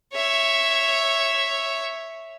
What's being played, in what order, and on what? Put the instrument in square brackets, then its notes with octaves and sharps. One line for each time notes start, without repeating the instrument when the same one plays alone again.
[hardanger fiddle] C#5 E5